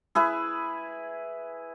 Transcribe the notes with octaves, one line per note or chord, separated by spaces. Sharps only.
E4 G#4 B4